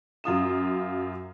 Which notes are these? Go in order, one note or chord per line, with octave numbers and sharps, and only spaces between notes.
F#2 F4 D#6 E7